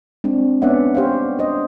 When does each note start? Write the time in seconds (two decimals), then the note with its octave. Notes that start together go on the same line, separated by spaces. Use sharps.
0.24 G#3 C4 D4
0.62 B3 C#4 D4 D5 E5 F#5
0.94 G4 C5 C#5 F5
1.39 D4 C5 D#5